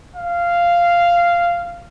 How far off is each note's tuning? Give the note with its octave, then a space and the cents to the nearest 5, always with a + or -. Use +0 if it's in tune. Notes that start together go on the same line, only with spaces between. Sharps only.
F5 -10